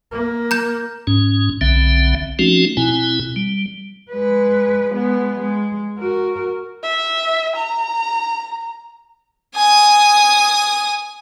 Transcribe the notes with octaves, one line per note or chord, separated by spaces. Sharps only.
A#3
A#5 G6
G#2 C#4
B1 D3 C4 E5
F3 A3 C4 C#4 D#4 F#4
B2 C4 E4 G#5
G3
G#3 B4
G#3 B3
G#3
F#4 A#4
E5
A#5
G#5 D#6